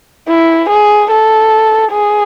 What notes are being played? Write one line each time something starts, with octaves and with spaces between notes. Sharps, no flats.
E4
G#4
A4
G#4